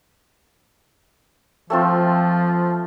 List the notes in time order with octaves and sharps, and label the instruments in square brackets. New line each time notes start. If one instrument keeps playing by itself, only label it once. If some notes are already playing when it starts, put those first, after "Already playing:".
[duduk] F3 [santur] A3 C4 F4